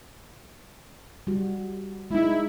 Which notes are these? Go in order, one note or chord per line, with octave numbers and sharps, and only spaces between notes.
G3 F#4
G#3 D#4 E4